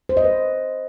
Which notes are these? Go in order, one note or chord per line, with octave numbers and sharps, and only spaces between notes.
C5
D#5
B4